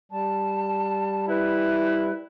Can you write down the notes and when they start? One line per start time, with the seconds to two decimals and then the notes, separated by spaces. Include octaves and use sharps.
0.12 G3 A5
1.29 E4 B4